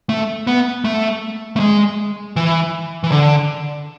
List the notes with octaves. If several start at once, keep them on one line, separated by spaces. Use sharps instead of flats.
A3
B3
A3
A3
G#3
E3
E3
D3